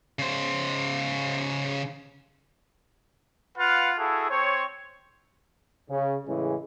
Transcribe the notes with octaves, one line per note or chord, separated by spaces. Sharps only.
C#3 C5
F4 B4 F5 F#5
E4 F#4 G#4 A4
C4 C5 C#5
C#3
A2 C#3 E3 G#3